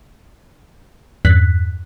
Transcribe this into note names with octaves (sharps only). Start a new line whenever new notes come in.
E2 G2 F#6 B6